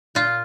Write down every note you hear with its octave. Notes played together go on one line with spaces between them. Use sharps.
A#2 F4